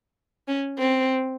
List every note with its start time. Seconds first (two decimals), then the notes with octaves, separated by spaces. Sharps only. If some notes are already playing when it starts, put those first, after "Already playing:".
0.48 C#4
0.78 C4